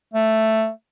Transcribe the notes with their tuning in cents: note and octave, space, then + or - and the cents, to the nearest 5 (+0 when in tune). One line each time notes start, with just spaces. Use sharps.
A3 +5